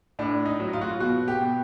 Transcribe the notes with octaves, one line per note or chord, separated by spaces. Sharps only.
A2 D4
D#4
F#3
F4
F#4
F4
B2 F#4
G4
B2